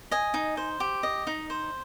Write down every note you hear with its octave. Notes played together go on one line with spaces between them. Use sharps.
D#5 G#5
D#4
C5
G4
D#5
D#4
C5